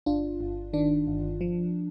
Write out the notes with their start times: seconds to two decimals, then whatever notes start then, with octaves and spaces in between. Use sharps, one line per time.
0.06 G1 D4 F4
0.41 G1
0.73 D#3 D4
1.07 G1
1.41 F3